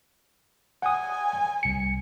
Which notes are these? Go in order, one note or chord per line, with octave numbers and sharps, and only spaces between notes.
F#5 G#5 D#6
C2 C#7